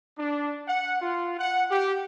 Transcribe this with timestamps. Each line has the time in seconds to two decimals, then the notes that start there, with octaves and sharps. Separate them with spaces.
0.18 D4
0.68 F#5
1.01 F4
1.39 F#5
1.71 G4